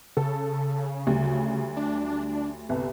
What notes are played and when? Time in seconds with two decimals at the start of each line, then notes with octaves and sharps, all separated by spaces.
0.17 C#3 A4
1.07 D2 F#3 G3
1.77 D4
2.69 G1 C2 C3